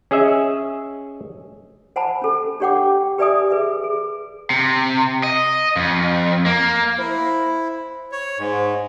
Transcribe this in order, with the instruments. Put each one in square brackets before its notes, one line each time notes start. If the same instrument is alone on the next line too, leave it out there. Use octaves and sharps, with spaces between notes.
[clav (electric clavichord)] C#4 G#4 D#5 E5
[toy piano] C5 F#5 G#5 A5 B5
C#4 A4
D4 G4 C#5 F#5 G5 D6
G4 B4 D5 E5 G#5 D#6
G#4 B4 E5
G#4
[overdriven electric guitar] C3
D#5
F2
A#3
[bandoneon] E4 [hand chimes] C5
[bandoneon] C#5
G#2